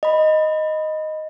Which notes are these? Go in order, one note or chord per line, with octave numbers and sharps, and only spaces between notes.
D#5 B5